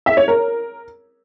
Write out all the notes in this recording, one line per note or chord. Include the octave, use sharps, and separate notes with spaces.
E5
C#5
A#4